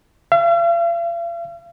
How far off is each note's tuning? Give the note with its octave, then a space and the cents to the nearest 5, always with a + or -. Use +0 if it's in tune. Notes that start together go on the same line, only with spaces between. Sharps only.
F5 -45